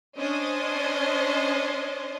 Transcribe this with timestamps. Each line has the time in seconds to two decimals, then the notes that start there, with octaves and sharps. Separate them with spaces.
0.18 C#4 D4 C5 D#5